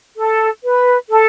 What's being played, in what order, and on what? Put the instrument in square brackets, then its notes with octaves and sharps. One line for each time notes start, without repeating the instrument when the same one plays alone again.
[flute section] A4
B4
A4